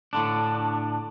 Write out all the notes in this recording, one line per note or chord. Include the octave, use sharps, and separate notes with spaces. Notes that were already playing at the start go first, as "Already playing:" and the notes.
A2 D3 D4